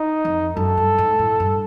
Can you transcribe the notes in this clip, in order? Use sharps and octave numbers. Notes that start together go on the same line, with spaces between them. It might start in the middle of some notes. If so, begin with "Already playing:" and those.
Already playing: D#4
F2
F#2 A4
G2
G#2
A2
G2